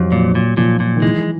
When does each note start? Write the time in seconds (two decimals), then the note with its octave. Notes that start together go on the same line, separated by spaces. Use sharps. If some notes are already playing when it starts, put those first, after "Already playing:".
Already playing: F2 F#3 G3
0.12 A#2 F#3
0.35 A#2
0.57 A#2 F3
0.80 A#2
0.96 D#3
1.02 E3 G#3